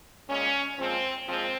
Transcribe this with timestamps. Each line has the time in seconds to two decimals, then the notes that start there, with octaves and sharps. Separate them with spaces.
0.28 A#2 G#3 C#4
0.77 A#2 F3 G#3 C4
1.28 A#2 F3 G#3 C4